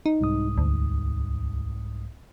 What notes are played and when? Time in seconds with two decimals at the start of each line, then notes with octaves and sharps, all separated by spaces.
0.06 D#4
0.21 C2 G#2 D#6
0.58 D2